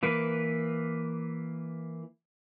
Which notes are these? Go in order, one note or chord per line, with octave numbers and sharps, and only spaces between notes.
E3 A#3 B4